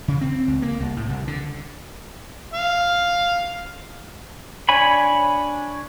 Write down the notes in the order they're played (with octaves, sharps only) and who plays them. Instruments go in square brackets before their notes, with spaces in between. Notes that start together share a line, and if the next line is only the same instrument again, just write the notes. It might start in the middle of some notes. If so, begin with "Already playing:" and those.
[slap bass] C#3
C4
C#2
A#3
C2
A2
C2
D3
[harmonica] F5
[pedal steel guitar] D4 C#5 G#5 B5